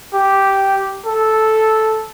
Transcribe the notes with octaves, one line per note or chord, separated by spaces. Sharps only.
G4
A4